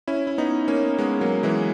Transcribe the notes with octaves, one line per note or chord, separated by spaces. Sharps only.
C#4 E4
E4
B3 D#4
A#3 C#4
G#3 B3
F#3 A#3
E3 G#3